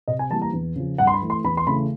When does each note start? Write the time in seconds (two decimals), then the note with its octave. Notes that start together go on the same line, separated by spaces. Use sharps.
0.08 C3 D#5
0.19 G#5
0.30 E3 G3 A#3 A5
0.42 A#5
0.53 E2
0.76 C#3 F3
0.98 G2 F#5
1.07 C6
1.14 B5
1.21 E3 A3
1.30 C6
1.44 E2 B5
1.57 C6
1.67 C#3 E3 A3 B5